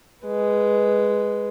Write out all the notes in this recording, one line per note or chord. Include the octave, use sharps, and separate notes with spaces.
G#3 B4